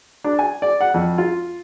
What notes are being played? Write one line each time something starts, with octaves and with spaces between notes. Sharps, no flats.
D4
G#5
D5
F#5
F2
F4